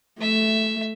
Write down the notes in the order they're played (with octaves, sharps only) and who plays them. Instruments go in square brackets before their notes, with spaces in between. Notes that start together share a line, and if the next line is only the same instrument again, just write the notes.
[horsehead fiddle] A3 [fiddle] E5